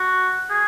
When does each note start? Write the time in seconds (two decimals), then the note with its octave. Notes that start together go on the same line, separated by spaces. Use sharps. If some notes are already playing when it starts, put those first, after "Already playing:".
Already playing: F#4
0.50 G#4